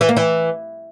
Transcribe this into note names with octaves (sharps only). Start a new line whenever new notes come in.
E3
A#3
E3